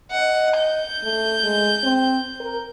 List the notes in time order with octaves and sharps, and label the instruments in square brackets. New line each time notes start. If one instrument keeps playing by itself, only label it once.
[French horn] D#5 [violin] F#5
[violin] G6
[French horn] A3
G#3
C4
A#4